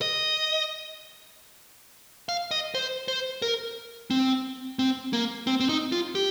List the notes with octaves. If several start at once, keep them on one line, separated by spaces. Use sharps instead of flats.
D#5
F5
D#5
C5
C5
A#4
C4
C4
A#3
C4
C4
D#4
F4
G4